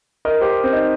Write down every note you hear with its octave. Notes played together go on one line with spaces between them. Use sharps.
A#4 D#5
G4 C5
C4
D#4